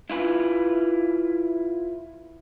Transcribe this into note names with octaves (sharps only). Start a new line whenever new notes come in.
E4 F4 B4